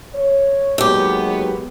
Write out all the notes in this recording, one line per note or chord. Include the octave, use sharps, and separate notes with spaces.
C#5
D#2 F#3 G#3 B3 G4